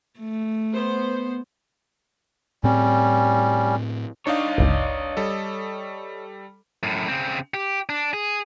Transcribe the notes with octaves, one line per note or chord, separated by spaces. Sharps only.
A3
B3 C5
A2 G3 C4 C#4
D4 D#4 C#5 D#5 F5
G1 C#2
G3 A4
F#2 A2
C#3 C4
G4
D4
G#4